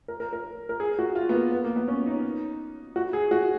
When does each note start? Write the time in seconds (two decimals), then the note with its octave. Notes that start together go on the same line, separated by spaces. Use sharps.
0.08 A#4
0.20 A#4
0.33 A#4
0.69 A#4
0.80 G#4
0.99 F#4
1.15 F4
1.29 B3
1.34 A#3
1.52 B3
1.64 A#3
1.76 B3
1.88 C#4
2.06 D#4
2.96 F#4
3.13 G#4
3.31 F#4